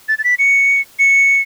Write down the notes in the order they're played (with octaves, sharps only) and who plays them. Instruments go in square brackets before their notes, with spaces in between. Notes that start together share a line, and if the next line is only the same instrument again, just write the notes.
[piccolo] A6
A6
B6
C#7
C#7